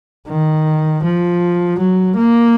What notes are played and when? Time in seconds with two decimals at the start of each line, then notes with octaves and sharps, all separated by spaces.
0.28 D#3
1.04 F3
1.79 F#3
2.17 A#3